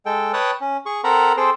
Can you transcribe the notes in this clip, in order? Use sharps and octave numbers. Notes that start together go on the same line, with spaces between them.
G#3 A4 G5
B4 C#5 G5 A5 D#6 F#6
C#4
G#4 C#6
C4 A4 A#4 F#5 A#5 B5
C4 G#4 A4 C5 G5